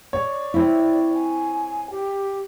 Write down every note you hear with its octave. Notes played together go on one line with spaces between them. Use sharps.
C#5 D5
C4 E4
G#5
G4